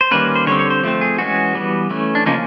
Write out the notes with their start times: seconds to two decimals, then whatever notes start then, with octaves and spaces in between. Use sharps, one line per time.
0.01 C5
0.11 D#3 G3 A#3 C#4 B4
0.35 C5
0.47 D3 G3 C4 C#5
0.59 C#5
0.70 C5
0.84 F3 A3 C4
1.01 G#4
1.18 E3 G#3 C#4 F#4
1.55 E3 G3 B3
1.90 E3 A3 C#4
2.15 D4
2.26 C#3 F3 A#3 C#4 D#4